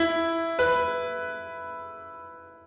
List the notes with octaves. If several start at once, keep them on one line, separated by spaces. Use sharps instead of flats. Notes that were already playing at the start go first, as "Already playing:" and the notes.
Already playing: E4
B4